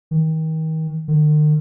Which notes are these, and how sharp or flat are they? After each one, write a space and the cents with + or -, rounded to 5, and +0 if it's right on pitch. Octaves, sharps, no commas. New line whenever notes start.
D#3 +35
D#3 -45